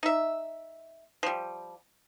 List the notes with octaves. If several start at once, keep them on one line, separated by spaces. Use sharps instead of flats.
D#4 E5
F3 G3